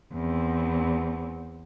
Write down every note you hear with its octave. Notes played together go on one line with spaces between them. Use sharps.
E2 C4